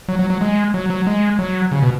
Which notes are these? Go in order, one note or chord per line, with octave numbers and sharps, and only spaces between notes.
F#3
F#3
F#3
G#3
F#3
F#3
G#3
F#3
C#3
B2